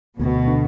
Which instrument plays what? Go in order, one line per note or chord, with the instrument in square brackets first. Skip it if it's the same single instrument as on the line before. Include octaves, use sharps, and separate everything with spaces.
[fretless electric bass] D2 [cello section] B2
[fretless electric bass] D3